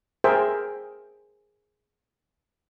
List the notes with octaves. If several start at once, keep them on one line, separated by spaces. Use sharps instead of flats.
G#4 A#4 C5 E5 G5